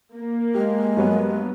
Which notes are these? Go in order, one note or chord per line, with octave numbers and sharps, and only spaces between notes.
A#3
G#3 G4
G2 F#3 B3